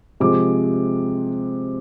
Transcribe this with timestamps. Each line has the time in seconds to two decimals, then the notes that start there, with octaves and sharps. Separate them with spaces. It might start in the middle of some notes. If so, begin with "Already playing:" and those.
0.20 C3 F3 G#3 D6